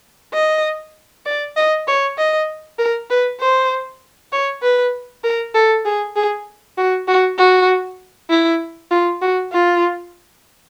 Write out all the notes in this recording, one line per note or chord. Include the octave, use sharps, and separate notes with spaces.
D#5
D5
D#5
C#5
D#5
A#4
B4
C5
C#5
B4
A#4
A4
G#4
G#4
F#4
F#4
F#4
E4
F4
F#4
F4